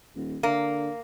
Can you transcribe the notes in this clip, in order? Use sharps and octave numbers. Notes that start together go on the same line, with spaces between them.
D#1
D3 A#3